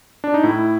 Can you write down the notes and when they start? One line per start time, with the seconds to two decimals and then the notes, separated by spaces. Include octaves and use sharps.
0.24 D4
0.34 D#4
0.43 A2 E4